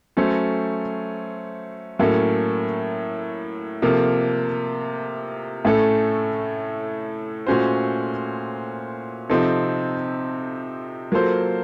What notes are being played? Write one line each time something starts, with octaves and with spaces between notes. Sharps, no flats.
F#3 A3 C#4 A4 C5
A2 F#3 A#3 C#4 A4
C3 F3 A#3 F4 A4
A2 A3 C#4 A4
A#2 A3 C#4 F#4 C5
C3 F3 C4 D#4 A4
F#3 A#3 F4 A4 C5